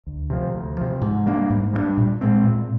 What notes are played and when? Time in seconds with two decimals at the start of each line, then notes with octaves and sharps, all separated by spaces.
0.07 D2
0.30 C3 F3
0.54 D2
0.78 C3 F3
1.01 G#2
1.26 G3 A#3 D4
1.50 G#2
1.73 G3 A#3
1.78 D4
1.97 A#2
2.21 G#3 C4
2.44 A#2